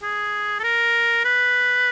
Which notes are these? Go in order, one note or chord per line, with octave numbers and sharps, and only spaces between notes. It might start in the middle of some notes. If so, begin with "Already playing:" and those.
G#4
A4
A#4
B4